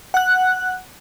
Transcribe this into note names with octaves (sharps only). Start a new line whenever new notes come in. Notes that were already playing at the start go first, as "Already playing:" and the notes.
F#5 F#6